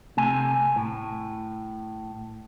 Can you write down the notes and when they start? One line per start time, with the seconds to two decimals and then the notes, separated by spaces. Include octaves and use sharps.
0.17 C3 A3 G#5
0.76 A2